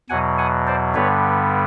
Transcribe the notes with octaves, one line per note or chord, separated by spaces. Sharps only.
E2 B2 F#3 F#5 G#5
F#5 G#5
C5 D5
G2 D3 G3 B3 B4 C#5